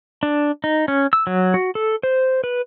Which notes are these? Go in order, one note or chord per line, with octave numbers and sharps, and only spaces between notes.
D4
D#4
C#4
E6
F#3
F#4
A4
C5
B4